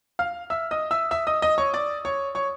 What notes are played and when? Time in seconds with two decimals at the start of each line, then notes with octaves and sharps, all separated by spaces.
0.19 F5 F6
0.50 E5 E6
0.71 D#5 D#6
0.91 E5 E6
1.11 E5 E6
1.27 D#5 D#6
1.42 D#5 D#6
1.58 C#5 C#6
1.74 D5 D6
2.05 C#5 C#6
2.35 C#5 C#6